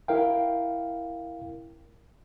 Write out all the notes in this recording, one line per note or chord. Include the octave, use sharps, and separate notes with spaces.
E4 A#4 F5 G5